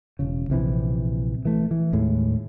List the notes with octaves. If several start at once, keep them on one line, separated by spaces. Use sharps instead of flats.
E1 C#3
A#1 C3 E3
E3 A3
E3
D#2 A2 G#3